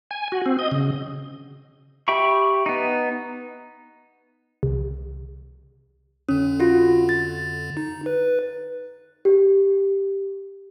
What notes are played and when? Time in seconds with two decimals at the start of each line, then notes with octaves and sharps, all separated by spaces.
0.11 G#5
0.32 F#4
0.46 C4
0.59 D#5
0.71 C#3
2.08 G4 E5 G5 B5 C#6
2.66 B3 D#4
4.63 C2
6.29 F2 D3 C#4
6.60 F4 F#4
7.09 A6
7.77 D#4
8.06 B4
9.25 G4